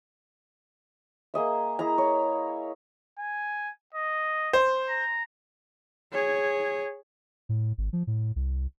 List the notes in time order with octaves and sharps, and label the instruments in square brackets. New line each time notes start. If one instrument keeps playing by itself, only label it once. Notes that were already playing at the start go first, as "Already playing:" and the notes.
[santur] A#3 G#4 D#5 E5
E4 G#4 D#5 A#5
C#5
[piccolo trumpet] G#5
D#5
[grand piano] C5
[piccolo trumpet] A#5
[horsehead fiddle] G#4 C#5
[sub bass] A2
G#1
F3
A2
C2